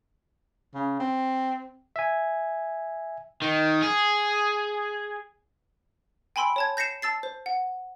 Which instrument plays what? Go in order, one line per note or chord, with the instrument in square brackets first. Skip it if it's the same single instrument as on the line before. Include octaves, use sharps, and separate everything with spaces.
[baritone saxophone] C#3
C4
[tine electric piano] E5 G#5
[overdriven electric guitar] D#3
G#4
[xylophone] G5 G#5 B5 C6 E6 D7
C#5 A5 G#6
G6 A#6 C7 C#7 E7
A5 E6 A6 C7
C5
F#5